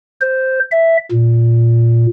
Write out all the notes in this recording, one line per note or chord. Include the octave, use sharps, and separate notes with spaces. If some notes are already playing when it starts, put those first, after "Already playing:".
C5
E5
A#2